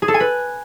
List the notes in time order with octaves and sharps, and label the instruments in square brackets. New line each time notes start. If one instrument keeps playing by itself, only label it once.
[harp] G#4
A4
G#5
B4